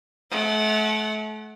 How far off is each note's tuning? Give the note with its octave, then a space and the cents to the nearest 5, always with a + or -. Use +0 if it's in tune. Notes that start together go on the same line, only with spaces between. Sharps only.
A3 -35 F#5 +0